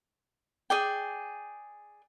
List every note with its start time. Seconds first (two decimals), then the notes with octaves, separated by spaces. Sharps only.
0.70 G#4 D5 G5